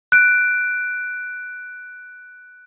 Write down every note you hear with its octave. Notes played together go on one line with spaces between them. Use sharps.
F#6 D7